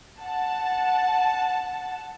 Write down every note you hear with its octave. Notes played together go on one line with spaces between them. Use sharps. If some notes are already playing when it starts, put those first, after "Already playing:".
F#5 A5